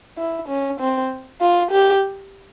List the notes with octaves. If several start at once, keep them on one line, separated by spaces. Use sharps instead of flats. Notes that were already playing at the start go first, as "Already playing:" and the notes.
E4
C#4
C4
F4
G4